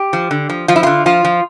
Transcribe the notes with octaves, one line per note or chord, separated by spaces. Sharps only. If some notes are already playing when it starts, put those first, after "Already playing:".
Already playing: G4
F3
D3
F3
F3 F4
E4
D3 F4
F3 F4
F3